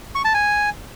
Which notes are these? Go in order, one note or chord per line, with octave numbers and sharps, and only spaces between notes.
C#6
A5
G#5